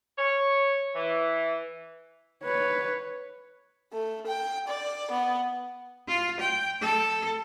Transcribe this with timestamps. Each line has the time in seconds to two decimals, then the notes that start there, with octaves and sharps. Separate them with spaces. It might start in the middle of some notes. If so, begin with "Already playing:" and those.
0.19 C#5
0.95 E3
2.44 B4 C#5
3.93 A3
4.27 G5
4.68 D5
5.11 B3
6.08 F4
6.40 G5
6.81 A4